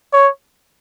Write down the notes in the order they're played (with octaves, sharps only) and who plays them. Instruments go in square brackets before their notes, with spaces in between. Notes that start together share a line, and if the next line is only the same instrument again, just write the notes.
[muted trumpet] C#5